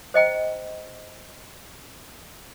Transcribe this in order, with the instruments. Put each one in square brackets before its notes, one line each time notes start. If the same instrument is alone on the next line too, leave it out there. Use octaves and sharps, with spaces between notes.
[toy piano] C5 D#5 G5 A#5